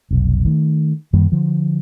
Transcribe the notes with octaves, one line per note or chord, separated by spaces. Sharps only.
F1 B1
D#3 A3
F#2 D#3 G3 A#3
D3 F3